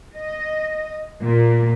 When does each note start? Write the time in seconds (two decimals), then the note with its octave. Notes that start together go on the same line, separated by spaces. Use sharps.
0.15 D#5
1.22 A#2